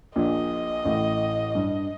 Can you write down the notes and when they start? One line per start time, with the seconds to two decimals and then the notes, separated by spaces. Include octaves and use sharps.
0.15 A#1 A#2 D#5
0.85 A1 A2
1.55 G2